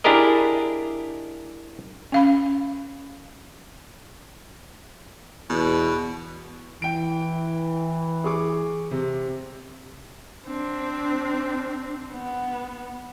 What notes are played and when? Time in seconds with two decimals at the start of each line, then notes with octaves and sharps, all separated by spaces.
0.04 D4 E4 G4 G#4 A#4 D#5
2.12 C#4 F5 B5
5.50 E2 B2
6.82 E3 G5 D7
8.24 G#4 C#6 D6
8.91 C3
10.47 C4 D4
12.11 B3